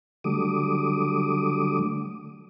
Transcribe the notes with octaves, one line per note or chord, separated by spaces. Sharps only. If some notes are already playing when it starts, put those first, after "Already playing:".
D3 F#3 G3 A3 D6 D#6